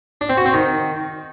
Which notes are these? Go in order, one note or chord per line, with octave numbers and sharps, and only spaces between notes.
D4
C4
F#4
C4
D#3